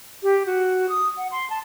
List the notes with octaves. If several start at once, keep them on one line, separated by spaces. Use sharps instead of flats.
G4
F#4
D#6
F#5
C6
A5